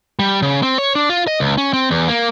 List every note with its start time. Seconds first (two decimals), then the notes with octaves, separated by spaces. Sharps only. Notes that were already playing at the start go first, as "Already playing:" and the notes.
0.19 G3
0.42 C#3
0.63 C4
0.78 C#5
0.95 D4
1.10 F4
1.27 D#5
1.40 C#2
1.58 C#4
1.73 C4
1.91 E2
2.09 A#3